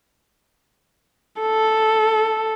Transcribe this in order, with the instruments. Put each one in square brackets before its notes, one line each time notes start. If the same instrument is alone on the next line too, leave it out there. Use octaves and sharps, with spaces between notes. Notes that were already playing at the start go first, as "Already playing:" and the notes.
[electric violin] A4